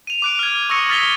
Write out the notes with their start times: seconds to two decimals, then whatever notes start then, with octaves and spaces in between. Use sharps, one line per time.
0.07 D#7 F7
0.22 D6 F#6 D7
0.39 F6 G#6
0.70 C#6 D#6 E6 A#6 C#7 D#7
0.89 D#6 F6 A6 B6 F7 G7